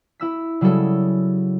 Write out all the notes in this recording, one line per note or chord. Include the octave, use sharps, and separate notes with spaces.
E4 E6 B6
C#3 F#3 G3 E4 G#4 A4